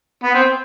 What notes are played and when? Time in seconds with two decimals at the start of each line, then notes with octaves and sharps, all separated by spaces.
0.23 B3
0.35 C4